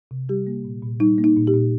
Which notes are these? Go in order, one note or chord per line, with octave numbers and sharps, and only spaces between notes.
C3
G3 G4
A#3
A#2
A#2
G3 D#4
A#3
D#4
A#2
G4
A#2